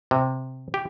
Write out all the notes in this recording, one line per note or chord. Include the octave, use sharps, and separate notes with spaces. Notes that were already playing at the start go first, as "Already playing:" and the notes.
C3
G4